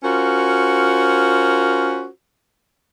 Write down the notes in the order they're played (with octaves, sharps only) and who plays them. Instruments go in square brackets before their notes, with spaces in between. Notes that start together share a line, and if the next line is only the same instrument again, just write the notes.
[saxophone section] C#4 F4 F#4 A#4 C5